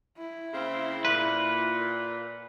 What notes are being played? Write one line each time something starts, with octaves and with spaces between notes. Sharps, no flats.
E4
C#3 A#3 C4
A#2 B4